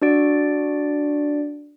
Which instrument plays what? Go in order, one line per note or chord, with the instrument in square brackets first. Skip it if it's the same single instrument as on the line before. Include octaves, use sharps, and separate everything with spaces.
[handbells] D4 F#4 D5 D7